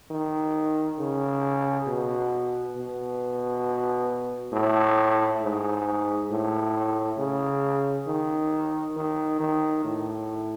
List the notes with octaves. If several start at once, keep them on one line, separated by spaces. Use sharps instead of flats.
D#3
C#3
B2
B2
A2
G#2
A2
C#3
D#3
D#3
D#3
A2